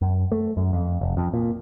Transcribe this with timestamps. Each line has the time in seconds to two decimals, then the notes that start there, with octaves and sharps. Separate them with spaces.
0.01 F#2
0.32 A3
0.57 F#2
0.73 F2
1.01 F1
1.17 F2
1.34 A#2